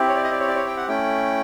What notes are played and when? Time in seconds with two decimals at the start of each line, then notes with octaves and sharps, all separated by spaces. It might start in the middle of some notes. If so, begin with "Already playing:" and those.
Already playing: C4 E4 G4
0.08 C#5
0.15 D5
0.24 D#5
0.31 D5
0.40 C#5
0.48 D5
0.56 C#5
0.67 G5
0.77 F#5
0.88 A3 C#4 E4 G5